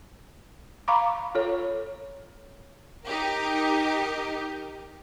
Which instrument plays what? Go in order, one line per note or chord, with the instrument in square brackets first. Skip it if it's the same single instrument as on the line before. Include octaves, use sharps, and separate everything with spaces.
[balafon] F5 A#5 B5 C#6 D6
F4 A4 C#5
[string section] D#4 G4 A#4